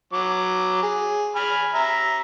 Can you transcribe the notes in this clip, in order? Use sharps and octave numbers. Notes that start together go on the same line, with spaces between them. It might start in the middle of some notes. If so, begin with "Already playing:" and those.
F#3 D6
G#4
G#5 B5 F6
E5 A#5